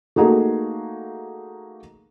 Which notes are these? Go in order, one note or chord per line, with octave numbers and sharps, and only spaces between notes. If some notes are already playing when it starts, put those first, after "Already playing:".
A3 A#3 D#4 F#4 G#4